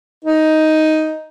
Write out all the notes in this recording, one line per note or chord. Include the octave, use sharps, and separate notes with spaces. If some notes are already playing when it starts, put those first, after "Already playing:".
D#4